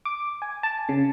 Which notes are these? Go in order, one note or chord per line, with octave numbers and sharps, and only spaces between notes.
D6
G#5
A5
C#3